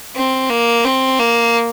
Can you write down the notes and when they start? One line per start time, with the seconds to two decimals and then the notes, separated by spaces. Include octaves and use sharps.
0.16 C4
0.50 A#3
0.85 C4
1.19 A#3